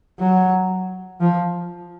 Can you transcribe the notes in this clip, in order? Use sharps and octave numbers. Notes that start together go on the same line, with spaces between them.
F#3
F3